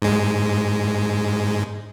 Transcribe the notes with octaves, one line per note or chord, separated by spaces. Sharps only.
G#2 G#3